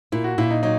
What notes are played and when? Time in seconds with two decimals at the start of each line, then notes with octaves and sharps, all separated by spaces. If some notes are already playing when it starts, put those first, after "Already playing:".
0.12 A#2 E4
0.24 F#4
0.38 A#2 E4
0.50 D#4
0.63 F#3 D#4